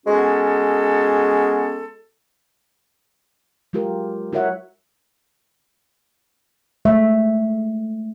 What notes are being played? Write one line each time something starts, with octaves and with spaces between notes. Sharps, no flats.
G#3 B3 C#4 F#4 A4
F#3 G#3 F4 G4 A#4
E4 F#4 A#4 C#5 E5 F#5
G#3 A3 E5